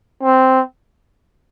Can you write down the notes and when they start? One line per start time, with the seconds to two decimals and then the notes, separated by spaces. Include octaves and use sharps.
0.23 C4